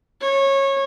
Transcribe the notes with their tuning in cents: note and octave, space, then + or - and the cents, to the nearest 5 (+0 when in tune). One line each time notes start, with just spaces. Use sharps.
C#5 -20